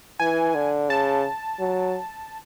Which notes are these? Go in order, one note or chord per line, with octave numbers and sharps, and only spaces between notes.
E3 G#5
D3
C#3 A5
F#3